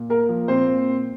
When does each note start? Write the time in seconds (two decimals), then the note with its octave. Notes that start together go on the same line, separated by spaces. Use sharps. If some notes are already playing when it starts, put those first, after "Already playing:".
Already playing: A#2
0.10 A#3 A#4
0.29 F3
0.48 A#2 C4 C5
0.68 A#2